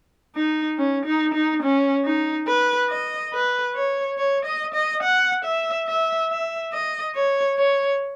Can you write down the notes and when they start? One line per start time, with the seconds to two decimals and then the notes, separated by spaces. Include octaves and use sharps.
0.35 D#4
0.78 C#4
1.05 D#4
1.34 D#4
1.62 C#4
2.05 D#4
2.47 B4
2.90 D#5
3.33 B4
3.74 C#5
4.18 C#5
4.45 D#5
4.74 D#5
5.03 F#5
5.44 E5
5.87 E5
6.30 E5
6.72 D#5
7.15 C#5
7.57 C#5